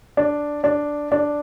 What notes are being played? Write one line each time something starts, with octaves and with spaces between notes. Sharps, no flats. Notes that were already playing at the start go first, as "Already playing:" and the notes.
D4
D4
D4